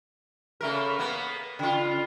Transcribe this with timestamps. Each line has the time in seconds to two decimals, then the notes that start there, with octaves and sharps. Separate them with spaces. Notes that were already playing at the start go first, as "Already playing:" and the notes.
0.61 C#3 A3 A#4
0.99 A#3 B3
1.59 C#3 F4